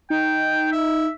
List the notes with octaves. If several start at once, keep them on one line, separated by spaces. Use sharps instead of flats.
D#4 G5
E5